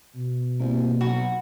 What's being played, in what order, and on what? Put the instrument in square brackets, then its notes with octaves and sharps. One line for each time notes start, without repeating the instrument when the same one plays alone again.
[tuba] B2
[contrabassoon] C2 [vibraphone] A#3
[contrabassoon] B1 [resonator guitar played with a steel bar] F#4 [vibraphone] B5